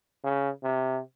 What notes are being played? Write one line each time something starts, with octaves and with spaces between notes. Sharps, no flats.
C#3
C3